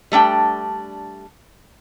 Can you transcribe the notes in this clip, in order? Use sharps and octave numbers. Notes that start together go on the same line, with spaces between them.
G3 A3 D4 G5